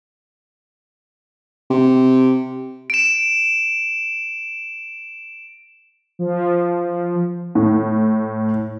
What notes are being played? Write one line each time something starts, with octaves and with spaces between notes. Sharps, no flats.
C3
D7 E7
F3
A2